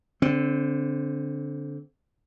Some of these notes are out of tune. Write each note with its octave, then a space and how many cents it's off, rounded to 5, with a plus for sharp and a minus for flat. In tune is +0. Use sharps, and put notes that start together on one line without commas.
D3 -20 C4 +0